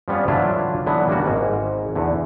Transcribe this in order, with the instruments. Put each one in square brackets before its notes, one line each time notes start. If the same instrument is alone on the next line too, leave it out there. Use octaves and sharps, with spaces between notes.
[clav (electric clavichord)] F3 G3 B3 C#4 F4
D3 E3 F#3 D4 E4 F4
D3 E3 F#3 B3
G3 A#3 C#4 F#4
G#1 G#2
E2 D3